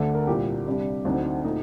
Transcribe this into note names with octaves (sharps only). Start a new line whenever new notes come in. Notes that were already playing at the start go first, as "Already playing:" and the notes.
Already playing: D2 D3 A3 D4 D5
A#4
C2 A#2 G3 G4
C3 G3 D4
D2 D3 F#3 C4 D#4
A#2 A3 D#4